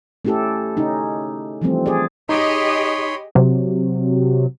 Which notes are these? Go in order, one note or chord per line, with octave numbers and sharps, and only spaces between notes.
A3 C#4 E4 G4 A4
C#3 C#4 D#4
E3 F3 G3 A3 C4
G#4 D5
D#4 G4 G#4 C#5 D#5 B5 C6
C3 F#3